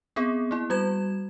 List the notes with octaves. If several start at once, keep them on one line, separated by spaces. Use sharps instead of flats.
B3 C4 G#4
A#3 E4
G3 F#4 G#6 E7